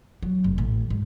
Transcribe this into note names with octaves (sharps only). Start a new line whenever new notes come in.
F#3
F1
A1
G#2